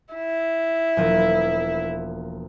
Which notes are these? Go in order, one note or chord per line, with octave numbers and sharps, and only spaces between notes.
E4
E1 F3 A#3